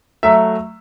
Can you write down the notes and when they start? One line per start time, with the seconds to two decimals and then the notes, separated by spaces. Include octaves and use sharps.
0.23 F#3 A3 E5